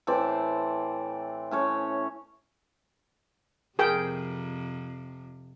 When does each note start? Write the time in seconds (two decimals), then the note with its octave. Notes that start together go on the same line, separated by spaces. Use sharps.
0.07 A2 E3 C4 D5
1.51 A2 C#4 C#5
3.79 F2 C3 G#4 A#4 G5